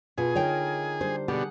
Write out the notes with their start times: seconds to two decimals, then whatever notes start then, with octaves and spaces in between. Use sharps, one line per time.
0.18 B2 F4 G#4
0.35 D3 D#4 A#4 C#5 D#5 G5
1.01 G3 D4 G4 C5
1.28 B2 D3 G4 G#4 F#5